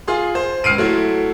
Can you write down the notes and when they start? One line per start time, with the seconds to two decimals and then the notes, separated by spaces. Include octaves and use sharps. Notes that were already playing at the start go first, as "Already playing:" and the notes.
0.08 F4 G#4 C6
0.35 C5
0.64 C#2 F6 C7 D7 D#7
0.78 F#3 A3 E4